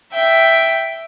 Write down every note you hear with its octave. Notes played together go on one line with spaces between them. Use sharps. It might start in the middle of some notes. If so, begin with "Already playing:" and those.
E5 G5